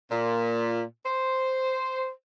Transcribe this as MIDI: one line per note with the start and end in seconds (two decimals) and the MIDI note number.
0.11 0.83 46
1.05 2.10 72